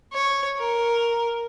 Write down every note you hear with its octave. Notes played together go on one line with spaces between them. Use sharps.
C#5
A#4